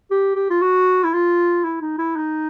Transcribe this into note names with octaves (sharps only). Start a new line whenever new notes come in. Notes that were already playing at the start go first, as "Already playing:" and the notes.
G4
G4
F4
F#4
E4
F4
E4
D#4
E4
D#4